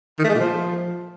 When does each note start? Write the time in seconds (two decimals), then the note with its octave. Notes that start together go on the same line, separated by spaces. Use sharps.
0.19 D#3
0.24 A3
0.29 G#3
0.35 A#2
0.40 F3